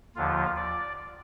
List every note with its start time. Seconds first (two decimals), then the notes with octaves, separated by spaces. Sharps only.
0.16 D#2 D3 F3 F4
0.56 D5